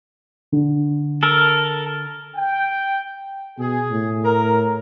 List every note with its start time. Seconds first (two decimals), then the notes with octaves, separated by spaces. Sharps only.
0.52 D3
1.23 A4 A#4
2.37 G5
3.59 B2 G#4
3.91 A2
4.24 A#4